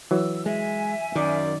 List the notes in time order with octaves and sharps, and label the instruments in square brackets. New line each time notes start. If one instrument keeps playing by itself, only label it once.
[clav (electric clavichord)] E3 F#3 [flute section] E6
[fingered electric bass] G#3 [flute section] E5 G#5
[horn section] F#2 D5 [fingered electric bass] D#3